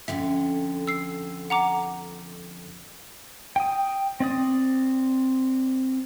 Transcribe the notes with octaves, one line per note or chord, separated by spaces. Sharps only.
F2 D3 C#4 E5
E6 C7
F#5 A#5 D6
G5 D#6
C4 D5 D#6